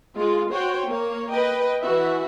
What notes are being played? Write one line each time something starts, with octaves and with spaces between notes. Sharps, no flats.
G#3 F4
F#4 C5 C#5 G5
A#3 C#5
B4 D#5 G5
E3 F#4 E5